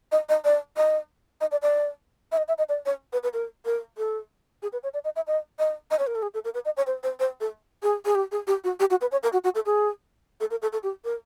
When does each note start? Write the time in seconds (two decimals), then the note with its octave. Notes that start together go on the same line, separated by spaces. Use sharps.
0.12 D#5
0.29 D#5
0.45 D5
0.77 D#5
1.41 D#5
1.51 D5
1.62 D5
2.32 E5
2.37 D#5
2.48 E5
2.58 D#5
2.69 D5
2.86 C#5
3.13 B4
3.23 B4
3.33 A#4
3.65 A#4
3.98 A4
4.63 G#4
4.73 B4
4.83 C#5
4.94 D5
5.04 D#5
5.16 E5
5.27 D#5
5.59 D#5
5.91 D#5
5.99 C#5
6.07 A#4
6.15 A4
6.22 G#4
6.34 A4
6.45 A#4
6.54 B4
6.65 D#5
6.77 C#5
6.87 C5
7.03 C5
7.20 C5
7.41 A4
7.83 G#4
8.05 G#4
8.15 G4
8.32 G#4
8.47 G4
8.64 F#4
8.80 G4
8.90 F#4
9.01 B4
9.12 C#5
9.23 A#4
9.33 F#4
9.44 F#4
9.55 A4
9.66 G#4
10.40 A4
10.51 A#4
10.62 A4
10.73 A4
10.83 G4
11.05 A#4